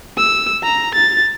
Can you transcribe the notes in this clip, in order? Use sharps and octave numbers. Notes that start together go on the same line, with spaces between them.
E6
A#5
A6